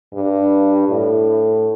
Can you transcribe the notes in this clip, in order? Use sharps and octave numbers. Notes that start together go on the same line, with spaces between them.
G2
A2